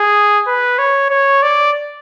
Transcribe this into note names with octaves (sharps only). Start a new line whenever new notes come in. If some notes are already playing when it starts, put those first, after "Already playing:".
Already playing: G#4
B4
C#5
C#5
D5